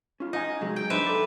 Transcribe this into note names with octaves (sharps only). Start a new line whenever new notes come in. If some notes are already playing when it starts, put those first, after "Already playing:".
C#4 F4
D#4 D#5 F5 G#5
C3 F#3 G#3
G5
D4 D#4 B4 C5 E5
A4 D5